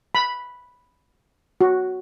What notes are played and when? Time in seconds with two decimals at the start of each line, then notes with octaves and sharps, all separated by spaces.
0.15 B5
1.61 F#4